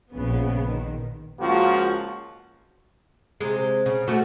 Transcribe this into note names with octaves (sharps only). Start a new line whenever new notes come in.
A#1 C#3 B3
D#3
C#2 F3 A#3 F#4
C3 G#3
C#3
A3 C#4 F#4